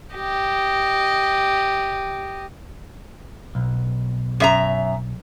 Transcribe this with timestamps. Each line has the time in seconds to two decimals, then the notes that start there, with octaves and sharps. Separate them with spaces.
0.14 G4 D#5
3.55 B1
4.40 F#2 E5 A#5